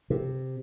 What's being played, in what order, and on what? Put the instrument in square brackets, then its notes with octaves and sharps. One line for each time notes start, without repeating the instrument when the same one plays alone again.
[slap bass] C3